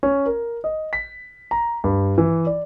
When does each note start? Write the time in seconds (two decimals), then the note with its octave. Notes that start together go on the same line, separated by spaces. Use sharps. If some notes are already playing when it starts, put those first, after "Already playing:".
0.03 C#4
0.26 A#4
0.64 D#5
0.93 B6
1.51 A#5
1.84 G2
2.18 E3
2.47 D5